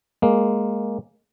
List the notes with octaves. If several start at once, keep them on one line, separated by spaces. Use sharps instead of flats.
G#3 A#3